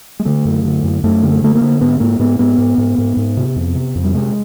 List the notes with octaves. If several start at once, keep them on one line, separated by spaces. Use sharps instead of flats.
G#3
D3 A3
F#2
D3
F#2
F#2 A3
D3
A3
D3 A3
A#3
D3
G#2 B3
G#2 A#3
G#2 B3
G#2 B3
G#2
G#2
G#2
G#2
C3
F2
C3
F2
G3
C3 G#3